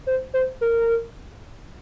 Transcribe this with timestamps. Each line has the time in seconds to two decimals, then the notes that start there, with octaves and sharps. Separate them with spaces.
0.07 C5
0.34 C5
0.61 A#4